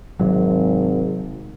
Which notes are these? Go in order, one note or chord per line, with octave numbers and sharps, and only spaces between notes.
G#1 C3 F#3